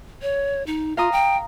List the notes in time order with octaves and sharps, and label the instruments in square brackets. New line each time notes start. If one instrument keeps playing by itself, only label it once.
[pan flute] C#5
D#4
[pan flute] F4 [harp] F5 A#5 D#6
[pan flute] G5